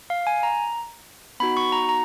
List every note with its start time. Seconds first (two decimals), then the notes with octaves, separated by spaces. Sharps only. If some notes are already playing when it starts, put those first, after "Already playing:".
0.10 F5
0.27 G#5
0.43 A#5
1.40 B3 D#4 F#4 B5
1.57 C#6
1.72 A#5
1.89 A#5